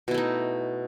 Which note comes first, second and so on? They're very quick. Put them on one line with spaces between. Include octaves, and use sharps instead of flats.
B2 E4 A3 D#4